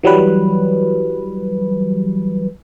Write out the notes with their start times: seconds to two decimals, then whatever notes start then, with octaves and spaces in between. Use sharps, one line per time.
0.03 E3 F#3 G3 B4